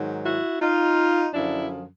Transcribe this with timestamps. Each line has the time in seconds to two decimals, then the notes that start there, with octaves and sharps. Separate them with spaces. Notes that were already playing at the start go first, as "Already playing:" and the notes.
Already playing: G#2 D#3 F#3
0.24 E4 F#4
0.60 D#4 F4
1.34 F#2 D3 F3 D4 E4